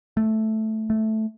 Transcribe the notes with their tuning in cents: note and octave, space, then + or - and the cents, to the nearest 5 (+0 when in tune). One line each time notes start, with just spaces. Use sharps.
A3 -5
A3 -5